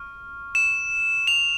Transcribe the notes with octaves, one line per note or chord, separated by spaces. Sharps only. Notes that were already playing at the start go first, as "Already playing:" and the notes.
Already playing: C#6 F6
E7
F7